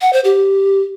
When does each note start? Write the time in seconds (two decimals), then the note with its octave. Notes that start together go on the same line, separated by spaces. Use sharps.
0.01 F#5
0.13 C5
0.24 G4